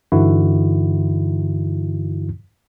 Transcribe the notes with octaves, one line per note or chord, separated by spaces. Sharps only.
G2 D3 E3 D#4 E4 F#4